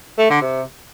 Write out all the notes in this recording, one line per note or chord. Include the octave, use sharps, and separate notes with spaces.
A3
D3
C3